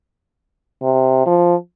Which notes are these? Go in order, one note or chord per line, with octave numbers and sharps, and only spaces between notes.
C3
F3